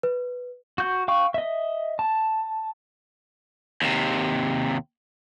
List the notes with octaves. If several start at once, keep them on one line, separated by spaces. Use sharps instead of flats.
B4
F#4 G6
F5 G5 C#6
D#5 E5
A5
D#2 C3